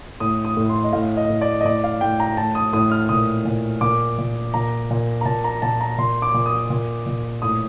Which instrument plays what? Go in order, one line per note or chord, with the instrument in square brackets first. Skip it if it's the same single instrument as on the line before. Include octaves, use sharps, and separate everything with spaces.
[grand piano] A2 D#6
D#6
A2
C6
D#5
A2 F5
D#5
A2
D5
D#5
A2 D5
F5
A2 G5
A#5
A2 A5
D#6
A2 D#6
F6
A#2 D#6
A#2
A#2 D6
A#2
A#2 A#5
A#2
A#5
A#2 A5
A#5
A#2 A5
A#5
A#2 C6
D6
A#2
D#6
A#2
A#2
A2 D#6